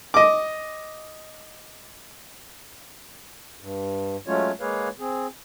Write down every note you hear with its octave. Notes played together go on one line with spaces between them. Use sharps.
D#5 D6
G2
F#3 G#3 A3 C#4 F4 C#5
G#3 A#3 G#4 B4 C#5 F5
C4 G#4